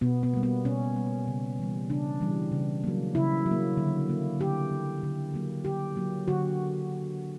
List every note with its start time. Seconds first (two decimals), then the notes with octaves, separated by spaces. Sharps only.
0.01 B2 B3
0.23 B3
0.33 G3 A#3
0.43 B3
0.65 B2 C#4
0.96 G3 A#3
1.27 C#3
1.59 E3 G3
1.89 C#3 D4
2.20 E3 G3
2.52 C#3
2.84 F#3 A#3
3.15 C#3 E4
3.46 F#3
3.51 A#3
3.77 D3
4.09 A#3
4.40 D3 G4
4.72 A#3
5.03 D3
5.34 F#3 A#3
5.65 D3 G4
5.96 F#3 A#3
6.28 D3 F#4